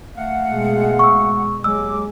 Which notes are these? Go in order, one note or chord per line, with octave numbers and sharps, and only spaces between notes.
A3 F5 F#5
B2 G#3
C#6 E6
D#2 F#3 G#3 D6 E6